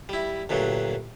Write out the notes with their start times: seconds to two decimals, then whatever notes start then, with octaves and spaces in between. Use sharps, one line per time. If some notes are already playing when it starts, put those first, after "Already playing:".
0.09 G3 E4
0.49 D2 G2 A#2 F#3